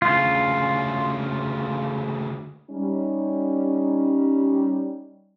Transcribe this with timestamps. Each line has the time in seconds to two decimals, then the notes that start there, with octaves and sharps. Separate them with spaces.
0.02 D2 C#3 F4
2.71 G3 C#4 D#4